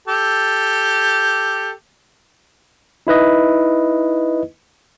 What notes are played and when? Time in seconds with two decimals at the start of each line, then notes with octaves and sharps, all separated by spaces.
0.08 G4 A4
3.07 D#4 E4 B4 D#5